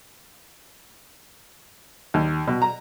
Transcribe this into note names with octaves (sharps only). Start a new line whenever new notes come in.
D#2
B2
A#5